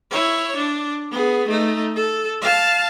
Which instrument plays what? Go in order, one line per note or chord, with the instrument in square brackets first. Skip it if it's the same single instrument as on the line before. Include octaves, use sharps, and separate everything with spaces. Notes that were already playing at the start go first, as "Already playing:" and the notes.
[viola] E4 C#5
D4
B3 G#4
A3 D#4
A4
F5 A5